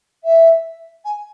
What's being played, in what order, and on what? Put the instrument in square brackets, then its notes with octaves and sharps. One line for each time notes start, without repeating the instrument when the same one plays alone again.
[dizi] E5
G#5